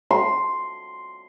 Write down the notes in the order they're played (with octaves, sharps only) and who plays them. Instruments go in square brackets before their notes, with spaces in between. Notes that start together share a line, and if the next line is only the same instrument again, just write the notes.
[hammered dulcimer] C6